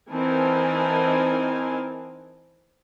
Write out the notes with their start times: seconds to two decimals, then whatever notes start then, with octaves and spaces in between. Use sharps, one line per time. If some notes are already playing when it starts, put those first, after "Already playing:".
0.11 E3 C4 D#4 A#4 G#5 A5